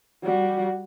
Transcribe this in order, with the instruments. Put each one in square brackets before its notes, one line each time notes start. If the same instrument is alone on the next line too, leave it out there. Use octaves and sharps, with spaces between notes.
[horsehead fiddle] G3 F#4